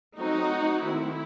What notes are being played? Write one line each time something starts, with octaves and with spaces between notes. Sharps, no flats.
F#3 A3 C4 D#4 F#4
D#3 A3 C4 E4